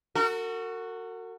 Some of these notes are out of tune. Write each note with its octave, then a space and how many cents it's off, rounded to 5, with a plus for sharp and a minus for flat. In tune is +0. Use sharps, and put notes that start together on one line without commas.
F#4 +0 A#4 -45